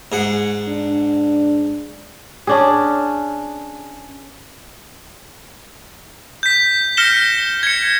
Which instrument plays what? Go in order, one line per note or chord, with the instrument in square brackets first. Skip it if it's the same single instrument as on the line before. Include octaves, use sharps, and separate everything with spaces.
[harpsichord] G#2 G#4 F#5
[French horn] D4
[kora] C#4 D4 G#4
[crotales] G6 B6
F6 A#6 C#7 E7 G7
G#6 C#7